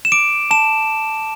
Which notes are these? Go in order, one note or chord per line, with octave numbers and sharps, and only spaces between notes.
E7
D6 D7
A5 E7